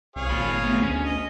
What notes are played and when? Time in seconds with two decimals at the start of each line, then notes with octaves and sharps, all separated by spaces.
0.16 C2 G#4 C#5 F5
0.30 G#1 A#2 B5
0.64 A3 B3
0.82 D2 C#4
1.05 D#5